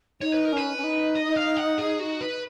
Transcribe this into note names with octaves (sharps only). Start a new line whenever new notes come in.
D#4 C#5
B4
A#4
C#4 B4
C#4
D#4
D#5
F5
F#5
G#4
F#4
B4